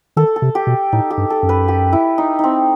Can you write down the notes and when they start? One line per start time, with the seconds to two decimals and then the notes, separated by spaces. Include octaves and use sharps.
0.16 D#3 A4
0.36 A4
0.42 C3
0.55 G4
0.67 B2
0.92 A2 D#4
1.10 G4
1.18 G2
1.30 A4
1.43 F#2
1.49 B4
1.68 G4
1.92 E4
2.18 D#4
2.39 C4 D#4